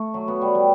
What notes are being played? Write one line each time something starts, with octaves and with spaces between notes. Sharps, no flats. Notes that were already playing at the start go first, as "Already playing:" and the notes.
Already playing: A3
F#3
B3
G3
G3